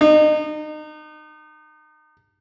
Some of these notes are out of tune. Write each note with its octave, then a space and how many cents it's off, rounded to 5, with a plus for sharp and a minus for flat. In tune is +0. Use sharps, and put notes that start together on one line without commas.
D#4 -30